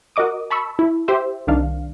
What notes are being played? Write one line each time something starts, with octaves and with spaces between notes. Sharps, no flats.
F#4 A#4 D#5 D6 D#6
A5 B5 C#6 E6
E4
G4 C5 E5
C2 D#3 D4 F5